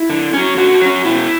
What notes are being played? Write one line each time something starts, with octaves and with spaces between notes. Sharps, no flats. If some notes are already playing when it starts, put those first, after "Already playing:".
Already playing: E4
D3
F#3 C#4
D3 F#4
F#3 C#4
B2 E4